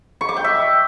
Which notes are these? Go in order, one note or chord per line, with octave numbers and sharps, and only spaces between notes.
C#6
D6
G5
E5